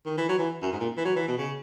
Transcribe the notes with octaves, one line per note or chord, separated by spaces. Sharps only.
D#3
E3
F#3
E3
F#2
G#2
A#2
E3
F#3
E3
B2
C#3